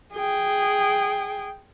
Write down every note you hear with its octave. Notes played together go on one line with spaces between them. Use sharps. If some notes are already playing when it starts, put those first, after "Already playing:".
G#4 G5